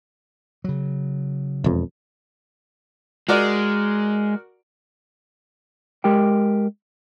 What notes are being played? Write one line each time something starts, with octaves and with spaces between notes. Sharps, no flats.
C#3 F#3
E1 F2
G#3 F#4 A#4 D5
G#3 G4 A#4 G5